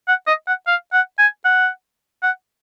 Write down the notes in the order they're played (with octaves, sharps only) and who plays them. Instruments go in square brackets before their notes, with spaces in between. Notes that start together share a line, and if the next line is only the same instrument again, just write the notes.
[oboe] F#5
D#5
F#5
F5
F#5
G#5
F#5
F#5